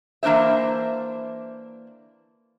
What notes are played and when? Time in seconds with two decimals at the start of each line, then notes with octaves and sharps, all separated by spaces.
0.23 E3 A#3 D4 C5 E5